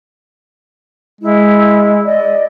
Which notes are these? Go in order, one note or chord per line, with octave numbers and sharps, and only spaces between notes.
G#3 E4
D5 D#5